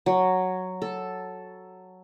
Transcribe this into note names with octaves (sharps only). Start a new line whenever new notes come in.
F#3
A4